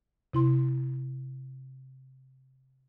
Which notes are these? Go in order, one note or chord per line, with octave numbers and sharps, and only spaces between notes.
C3 E4 C6